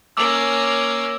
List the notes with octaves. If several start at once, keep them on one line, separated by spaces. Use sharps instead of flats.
A#3 C#4 D6 E6